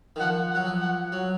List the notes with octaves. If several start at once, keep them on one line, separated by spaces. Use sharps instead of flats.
D#3
F3 F#5
F#5
F#3
F3
F#5
F#3